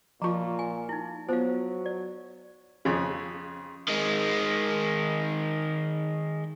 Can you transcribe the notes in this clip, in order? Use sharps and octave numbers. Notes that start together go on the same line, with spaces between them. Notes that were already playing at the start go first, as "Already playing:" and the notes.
A#2 F3 F4 A5 A#5 C#6
G#5
D#4 E4
F#3 B3 F4 C5 F5
D5
F2 C#3
D#3 G#3